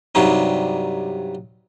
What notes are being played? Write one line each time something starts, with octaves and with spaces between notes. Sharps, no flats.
G2 C3 F#3 G3 D#4